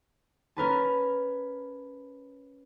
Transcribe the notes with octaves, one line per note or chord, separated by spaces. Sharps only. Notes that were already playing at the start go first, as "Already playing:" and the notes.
C#4 A#4 B4 A5